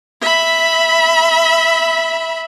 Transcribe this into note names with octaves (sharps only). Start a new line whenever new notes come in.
E5 B5